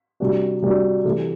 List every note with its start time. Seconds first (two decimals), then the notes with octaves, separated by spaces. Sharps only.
0.20 C3 G3 D4 F#4
0.62 C3 G3 D4 F#4
1.05 C3 E3 A3